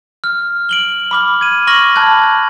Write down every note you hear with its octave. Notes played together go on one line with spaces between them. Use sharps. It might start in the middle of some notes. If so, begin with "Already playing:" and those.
F6
D7 F#7 G7
B5 D6 F6
G#6 D#7
C#6 D6 F6 A#6 F#7
A5 B5 F#6 G#6